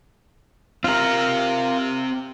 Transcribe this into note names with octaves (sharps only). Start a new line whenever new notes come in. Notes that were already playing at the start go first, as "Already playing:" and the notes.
C4 F4 G4 A#4